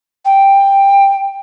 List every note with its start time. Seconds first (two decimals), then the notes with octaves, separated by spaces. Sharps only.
0.24 G5